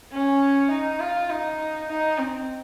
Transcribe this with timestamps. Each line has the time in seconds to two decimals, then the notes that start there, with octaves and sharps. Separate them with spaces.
0.12 C#4
0.71 D#4
1.00 F4
1.30 D#4
1.89 D#4
2.19 C4